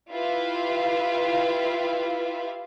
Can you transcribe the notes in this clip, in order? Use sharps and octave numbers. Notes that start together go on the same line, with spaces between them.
E4 F4 G4 B4 E5 F5